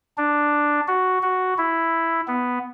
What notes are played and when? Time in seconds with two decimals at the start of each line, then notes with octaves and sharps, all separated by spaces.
0.18 D4
0.88 F#4
1.22 F#4
1.58 E4
2.28 B3